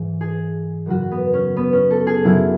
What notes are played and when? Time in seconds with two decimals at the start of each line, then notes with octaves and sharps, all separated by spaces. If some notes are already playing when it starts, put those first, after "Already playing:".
Already playing: G#2 E3 G#3
0.21 G#4
0.86 F#2 C#3 F#3 F#4
1.11 B3
1.33 C#4
1.57 B3
1.73 C#4
1.91 A4
2.07 G#4
2.24 F#2 C#3 F#3 E4